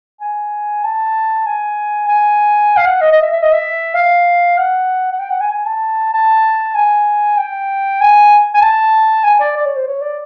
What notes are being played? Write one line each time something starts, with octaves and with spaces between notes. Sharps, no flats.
G#5
A5
G#5
G#5
F5
F#5
D#5
D#5
E5
E5
D#5
E5
F5
F#5
F#5
G5
F#5
G#5
G#5
A5
A5
G#5
G5
G#5
G#5
A5
G#5
D5
D5
C#5
C5
C#5
D5